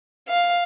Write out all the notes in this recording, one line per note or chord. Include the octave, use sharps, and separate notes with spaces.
F5